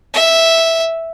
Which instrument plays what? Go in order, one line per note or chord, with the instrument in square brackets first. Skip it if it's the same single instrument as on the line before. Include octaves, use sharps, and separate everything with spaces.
[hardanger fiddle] E5